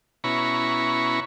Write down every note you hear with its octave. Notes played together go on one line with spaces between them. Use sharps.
B2 C#4 E4 A#5 B5 C#6